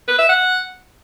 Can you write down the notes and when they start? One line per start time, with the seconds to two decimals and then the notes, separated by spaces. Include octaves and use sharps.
0.08 B4
0.18 E5
0.29 F#5